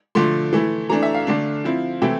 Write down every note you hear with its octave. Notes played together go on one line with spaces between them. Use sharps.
D3 F3 A3 C6
E3 A3 E4
E3 A3 D4 A#5
E5
F5
D3 A3 D4
F3 C4 E4
C3 E3 A3 C4 E4 G5